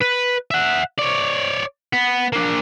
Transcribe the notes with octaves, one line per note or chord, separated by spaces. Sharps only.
B4
E5 F#5
C#5 D5
B3
A#3 D4